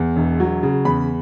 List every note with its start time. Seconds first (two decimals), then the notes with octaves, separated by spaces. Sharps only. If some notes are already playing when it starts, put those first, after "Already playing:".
Already playing: E2
0.16 E1
0.40 F#3
0.63 C#3
0.85 E2 B5